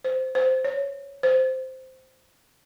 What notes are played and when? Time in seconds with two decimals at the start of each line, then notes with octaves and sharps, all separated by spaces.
0.04 C5
0.35 C5
0.64 C#5
1.23 C5